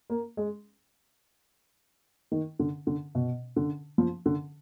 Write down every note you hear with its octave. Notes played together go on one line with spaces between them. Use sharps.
A#3
G#3
D#3
D3
D3
B2
D3
F3
D3